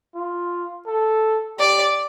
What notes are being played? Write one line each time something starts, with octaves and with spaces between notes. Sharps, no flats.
F4
A4
G4 D5